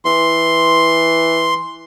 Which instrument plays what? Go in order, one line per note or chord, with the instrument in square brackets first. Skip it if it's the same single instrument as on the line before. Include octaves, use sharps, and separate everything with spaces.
[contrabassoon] E3 [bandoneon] C6